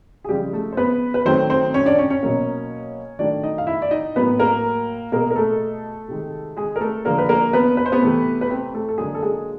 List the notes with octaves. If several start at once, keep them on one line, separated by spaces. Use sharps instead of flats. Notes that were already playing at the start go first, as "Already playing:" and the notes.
G#4
C#3 F3 G3 G#3 G4
A3 A4
C5
B3 B4
B4
D#3 F#3 A3 C4 C5
C4 C5
C#4 C#5
D4 D5
C#4 C#5
C#4 C#5
B2 F#3 A#3
D#3 F#3 A3 D4 D5
D#4 D#5
F5
E4 E5
D5
D#4 D#5
A2 F#3 A#3 B3 B4
A#3 A#4
B2 G#3 A#3 A#4
A#4
A3 A4
C3 D#3 G#3
G#3 G#4
A#4
A3 A4
D3 F3 G#3 A#3 A#4
B4
A#3 A#4
B3 B4
B4
C5
B3 B4
C3 E3 A3
B4
C4 C5
A3 A4
A4
D3 F#3 G#3 A#3 G#4
A4
G#3 G#4